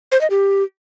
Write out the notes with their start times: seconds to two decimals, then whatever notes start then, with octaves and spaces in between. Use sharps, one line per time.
0.12 C5
0.21 D#5
0.30 G4